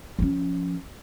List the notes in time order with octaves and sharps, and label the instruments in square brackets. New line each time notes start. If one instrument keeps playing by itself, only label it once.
[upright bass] F3 C#4